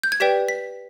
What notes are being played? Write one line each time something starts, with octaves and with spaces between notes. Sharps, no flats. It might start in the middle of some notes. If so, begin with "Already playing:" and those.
G6
G#6
G4 B4 D5 G5 B6
B6